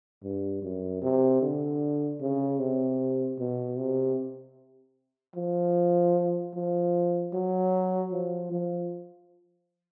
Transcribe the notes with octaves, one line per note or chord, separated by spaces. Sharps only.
G2
F#2
C3
D3
C#3
C3
B2
C3
F3
F3
F#3
F3
F3